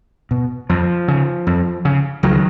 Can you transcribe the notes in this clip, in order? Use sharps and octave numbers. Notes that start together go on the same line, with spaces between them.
B2
F2 F3
C#3
F2
C#3
C#2 D#3 F#3